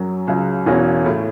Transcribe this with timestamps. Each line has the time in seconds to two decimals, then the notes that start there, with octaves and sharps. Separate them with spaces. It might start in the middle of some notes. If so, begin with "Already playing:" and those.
Already playing: F#2 F#3
0.28 C#2 C#3 F#3
0.66 E1 E2 E3 C#4 F#4
1.05 A2 A3